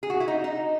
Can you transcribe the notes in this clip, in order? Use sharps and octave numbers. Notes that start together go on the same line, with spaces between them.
G#4
F#4
E4
D#4
D#4